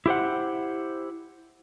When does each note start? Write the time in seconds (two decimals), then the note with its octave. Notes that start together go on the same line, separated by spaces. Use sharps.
0.06 E4 G4 C5 F#5